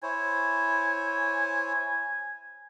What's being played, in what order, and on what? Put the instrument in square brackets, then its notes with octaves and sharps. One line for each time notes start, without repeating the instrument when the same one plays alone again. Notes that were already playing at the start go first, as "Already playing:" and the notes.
[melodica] E4 C5 C#5 [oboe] G#5